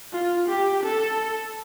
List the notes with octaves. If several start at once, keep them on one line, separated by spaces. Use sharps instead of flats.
F4
G4
A4